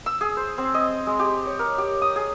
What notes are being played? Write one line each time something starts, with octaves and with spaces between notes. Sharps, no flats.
E6
G#4
C5
C4
D#5
G#3
G4
C#5
A#4
G4
D#6
G#4